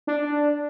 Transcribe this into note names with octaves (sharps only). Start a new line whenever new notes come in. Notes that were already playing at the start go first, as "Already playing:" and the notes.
D4